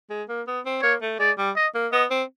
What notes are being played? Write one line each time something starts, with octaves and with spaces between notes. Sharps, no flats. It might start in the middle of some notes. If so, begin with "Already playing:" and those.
G#3
A#3
B3
C4
A#3 C#5
A3
G#3 D5
G3
D#5
A#3
B3 D#5
C4